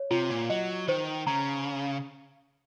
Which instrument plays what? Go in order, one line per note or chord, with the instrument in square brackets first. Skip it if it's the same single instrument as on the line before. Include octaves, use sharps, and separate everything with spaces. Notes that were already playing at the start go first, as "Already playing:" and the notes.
Already playing: [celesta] C#5
[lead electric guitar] C3 [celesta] F4
[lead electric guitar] A#2
[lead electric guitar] F#3 [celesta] D#5
[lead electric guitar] D#3 [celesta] C5
[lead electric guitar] C#3 [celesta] A#5